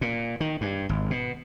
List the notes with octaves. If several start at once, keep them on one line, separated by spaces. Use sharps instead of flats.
A#2
D#3
G2
G#1
B2